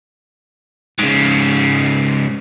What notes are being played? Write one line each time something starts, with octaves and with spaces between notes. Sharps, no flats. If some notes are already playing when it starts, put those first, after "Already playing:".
G#2 C#3